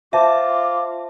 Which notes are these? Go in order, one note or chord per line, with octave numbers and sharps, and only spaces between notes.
F4 C5 E5 A5 D6 A6